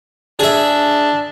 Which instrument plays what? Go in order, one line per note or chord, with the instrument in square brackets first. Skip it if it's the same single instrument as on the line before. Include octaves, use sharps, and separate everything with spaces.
[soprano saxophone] D4 [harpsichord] G#4 E5